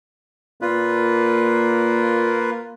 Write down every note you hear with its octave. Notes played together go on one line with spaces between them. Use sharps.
A#2 A#3 F4 B4